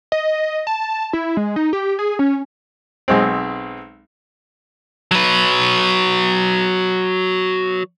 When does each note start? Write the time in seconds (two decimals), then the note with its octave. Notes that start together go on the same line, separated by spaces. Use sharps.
0.12 D#5
0.67 A5
1.13 E4
1.37 G#3
1.56 D#4
1.73 G4
1.99 G#4
2.19 C#4
3.08 B1 G#3 C4
5.11 F#3 B4